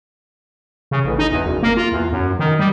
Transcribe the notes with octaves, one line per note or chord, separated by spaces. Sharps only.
C#3
A1
D#4
E2
F#1
A#3
F4
E2
F#2
D#3
G3